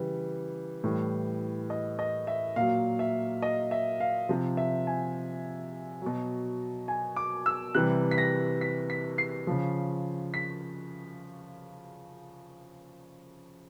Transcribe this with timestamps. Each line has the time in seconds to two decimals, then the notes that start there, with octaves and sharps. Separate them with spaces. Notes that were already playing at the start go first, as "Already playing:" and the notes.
Already playing: C#3 E3 G3
0.84 A2 E3 G3
1.70 D#5
1.99 D#5
2.27 E5
2.56 A#2 F#3 F5
2.99 E5
3.42 D#5
3.71 E5
4.00 F5
4.29 C3 F3
4.57 E5
4.87 G#5
6.02 B2 F#3
6.88 G#5
7.16 D6
7.46 E6
7.75 C3 E3 G3 F#6
8.11 B6
8.18 A#6
8.61 B6
8.90 B6
9.18 C7
9.47 C#3 F3
10.34 B6